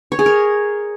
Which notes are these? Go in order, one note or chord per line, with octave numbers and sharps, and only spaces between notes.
C#5
G#4
A#4